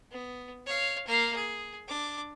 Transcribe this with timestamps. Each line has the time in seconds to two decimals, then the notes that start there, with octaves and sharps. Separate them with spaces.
0.11 B3
0.66 C#5 F5
1.07 A#3 F5
1.36 G#4
1.88 D4 D6